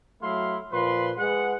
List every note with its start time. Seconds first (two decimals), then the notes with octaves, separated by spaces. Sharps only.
0.22 F#3 A3 E4 F5 C6
0.72 A#2 F3 B4 C6
1.18 G#3 B4 F#5